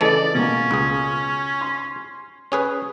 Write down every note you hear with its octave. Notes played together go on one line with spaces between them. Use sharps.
C#3 E3 A3 A4 D5 D#5
B2 A#3 C#4
C#2 G#4
C6
C#4 G#4 B4